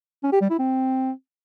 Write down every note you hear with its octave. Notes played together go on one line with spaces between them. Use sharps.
C#4
G4
G3
E4
C4